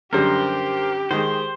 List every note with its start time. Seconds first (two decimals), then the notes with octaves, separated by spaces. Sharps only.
0.13 F#2 D3 G3 G4 A#4 C5
1.11 D#3 G#3 C5